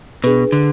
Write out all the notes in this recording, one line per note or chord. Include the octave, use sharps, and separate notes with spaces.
B2 D4 G#4 B4
D3